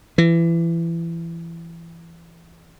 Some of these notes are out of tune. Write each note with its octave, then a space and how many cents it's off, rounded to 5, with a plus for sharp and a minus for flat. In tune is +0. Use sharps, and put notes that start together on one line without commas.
E3 +25